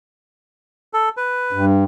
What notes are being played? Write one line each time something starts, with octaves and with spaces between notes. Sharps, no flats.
A4
B4
G2